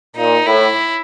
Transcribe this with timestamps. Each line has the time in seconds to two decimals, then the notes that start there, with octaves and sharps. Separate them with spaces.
0.16 A#2 D#4
0.46 A2 E4